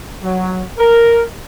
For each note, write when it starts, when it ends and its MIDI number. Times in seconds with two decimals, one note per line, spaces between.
0.23 0.63 54
0.78 1.22 70